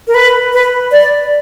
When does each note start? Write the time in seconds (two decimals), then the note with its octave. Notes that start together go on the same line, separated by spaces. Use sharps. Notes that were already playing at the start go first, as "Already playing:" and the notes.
0.07 A#4
0.14 B4
0.53 B4
0.92 D5